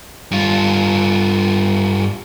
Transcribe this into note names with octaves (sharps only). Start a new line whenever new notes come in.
G2 F4